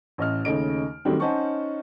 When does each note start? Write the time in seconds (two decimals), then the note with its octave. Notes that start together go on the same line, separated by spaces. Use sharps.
0.18 A1 D#5 F6
0.45 D#2 C#3 A3 D#5 D7
1.05 D#3 F#3 G3 A3 C4
1.20 C#4 D#4 C5 F#5 A5 C#6